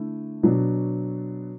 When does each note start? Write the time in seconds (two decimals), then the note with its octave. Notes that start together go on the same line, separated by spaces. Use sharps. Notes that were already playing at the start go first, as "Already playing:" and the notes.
Already playing: D3 A3 E4
0.43 B2 F#3 B3 D4